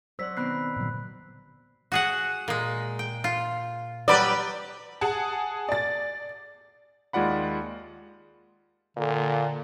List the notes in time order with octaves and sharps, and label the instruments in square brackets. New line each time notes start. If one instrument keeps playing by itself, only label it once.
[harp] F#3 F#6 [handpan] C5 D5 [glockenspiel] E6 B6
[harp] B2 D#3 C4 [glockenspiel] B5 F#6 C7
[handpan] A#2 D3 F#3
[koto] F#4 G#4 F#5
A#2 G#3
G5
F4
[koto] F#3 G3 G4 [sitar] B4 D5
[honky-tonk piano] G#4 F#5 G#5 A5
D5 A6
[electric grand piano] D#2 G#3 F4 D5 F#5 B5
[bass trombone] A#2 [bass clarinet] D3